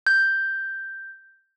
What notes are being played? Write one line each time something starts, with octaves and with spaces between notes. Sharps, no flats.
G6